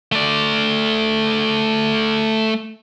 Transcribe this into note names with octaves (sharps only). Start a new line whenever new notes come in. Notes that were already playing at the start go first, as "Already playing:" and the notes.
A3 D5